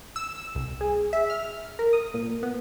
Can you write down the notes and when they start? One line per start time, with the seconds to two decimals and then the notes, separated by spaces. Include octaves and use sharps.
0.16 E6
0.55 C2
0.81 G#4
1.13 E5
1.30 F6
1.79 A#4
1.93 D#6
2.14 A#2
2.43 B3